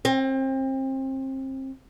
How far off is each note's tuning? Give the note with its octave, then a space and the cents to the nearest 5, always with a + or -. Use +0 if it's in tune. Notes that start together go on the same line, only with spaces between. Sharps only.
C4 +30